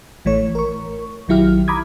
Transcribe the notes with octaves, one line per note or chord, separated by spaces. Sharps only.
A1 E3 A3 C#5
A#4 C#6
A#1 D#3 F#3 E4 G4 F6
A#5 B5 D6 D#6 G#6